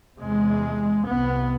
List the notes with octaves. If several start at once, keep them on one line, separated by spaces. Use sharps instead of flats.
E2 C3 G#3
C2 C3 B3